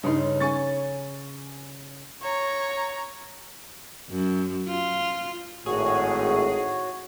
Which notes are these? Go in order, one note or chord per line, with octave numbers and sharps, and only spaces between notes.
G2 C#3 D#4 C6
C#4 G#5 C#6 A6
C#5 A#5
F#2
F4
G#1 A2 F#4 G#4 C#5